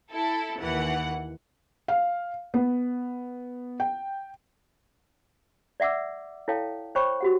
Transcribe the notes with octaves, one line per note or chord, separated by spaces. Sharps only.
E4 A4
D#2 E3 F#5
F5
B3
G5
D5 E5 F#5 D6 E6
E4 A4 C#5 F5 G5 A5
C5 C#5 G5 B5 C#6
F#4 G4 F#5